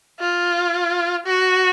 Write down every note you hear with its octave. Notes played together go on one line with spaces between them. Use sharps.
F4
F#4